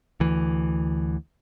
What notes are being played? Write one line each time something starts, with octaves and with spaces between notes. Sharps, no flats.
D2 E3